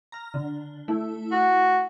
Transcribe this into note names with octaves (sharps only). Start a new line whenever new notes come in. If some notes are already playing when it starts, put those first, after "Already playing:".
A#5 F6
D3
A3 E4
F#4